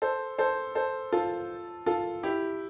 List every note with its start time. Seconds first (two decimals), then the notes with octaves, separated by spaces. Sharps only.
0.02 A4 C5
0.38 A4 C5
0.75 A4 C5
1.12 F4 A4
1.86 F4 A4
2.23 E4 G4